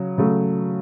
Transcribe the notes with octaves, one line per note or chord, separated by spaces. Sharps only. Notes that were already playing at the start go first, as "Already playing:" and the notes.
Already playing: C#3 F#3
C#3 F#3 A3